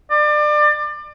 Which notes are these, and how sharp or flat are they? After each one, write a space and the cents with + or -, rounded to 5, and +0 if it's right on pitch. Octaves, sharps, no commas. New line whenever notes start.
D5 +30